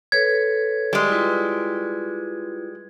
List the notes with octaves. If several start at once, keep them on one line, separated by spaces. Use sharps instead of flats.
A4 B4 C#5 G#6
G3 G#3
E4 F4 B4